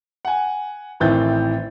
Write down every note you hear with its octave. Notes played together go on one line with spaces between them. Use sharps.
F#5 G#5
A1 D#3 E3 C4 G6 A6